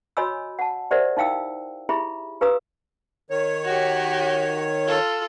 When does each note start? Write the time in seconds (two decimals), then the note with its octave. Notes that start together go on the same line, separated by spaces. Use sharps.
0.17 F#4 C#5 D#5 G#5 B5 E6
0.59 F#5 A5
0.91 G4 A#4 C5 D5 E5 F#5
1.17 D#4 E4 F5 G5 E6
1.89 E4 G4 G#4 E5 B5
2.41 G4 B4 F5 A#5 D#6 E6
3.30 D#3 C#5
3.65 F#4 G4
4.87 F4 A4